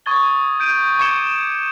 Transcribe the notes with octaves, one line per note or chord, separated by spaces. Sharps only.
C#6 D#6 G#6 A6 G7
G6 D7 D#7
C#6 D6 G#6 C#7 E7 G7